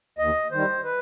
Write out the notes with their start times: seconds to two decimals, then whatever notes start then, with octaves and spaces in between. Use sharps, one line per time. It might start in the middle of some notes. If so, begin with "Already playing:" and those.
0.18 D#2 D#5
0.51 D#3 G3 C5
0.84 B4